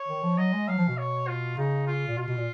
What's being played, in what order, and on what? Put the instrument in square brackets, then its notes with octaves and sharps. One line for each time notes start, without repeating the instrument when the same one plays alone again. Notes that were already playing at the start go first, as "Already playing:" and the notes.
Already playing: [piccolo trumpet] C#5
[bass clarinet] D#3
F3
[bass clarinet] F#3 [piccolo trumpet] D#5
[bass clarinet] G#3
[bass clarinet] F#3 [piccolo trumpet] F5
[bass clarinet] F3
B2
[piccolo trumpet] C#5
F4
[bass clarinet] C#3 [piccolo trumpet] D#4
[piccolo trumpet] F4
[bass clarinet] A#2
[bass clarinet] B2 [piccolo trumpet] F4
[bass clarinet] B2
A#2